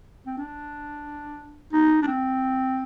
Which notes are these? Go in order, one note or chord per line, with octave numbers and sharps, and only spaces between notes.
C4
D4
D#4
D4
C4